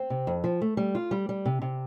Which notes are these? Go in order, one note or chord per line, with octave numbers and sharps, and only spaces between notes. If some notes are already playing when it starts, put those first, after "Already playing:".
Already playing: C4
C3
F2
F3
A3
G3
F4
G3
G3
C3
C3